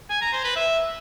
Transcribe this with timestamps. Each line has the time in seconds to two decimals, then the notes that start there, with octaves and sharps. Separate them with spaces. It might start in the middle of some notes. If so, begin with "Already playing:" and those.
0.10 G#5
0.21 A#5
0.33 C5
0.44 B4
0.56 E5